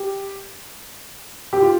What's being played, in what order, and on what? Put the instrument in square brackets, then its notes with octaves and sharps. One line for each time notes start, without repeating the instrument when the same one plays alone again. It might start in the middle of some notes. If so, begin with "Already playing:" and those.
Already playing: [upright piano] G4
G4
F4